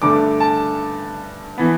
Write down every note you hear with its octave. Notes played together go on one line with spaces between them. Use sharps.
G2 D3 A3 D6
A5
E3 B3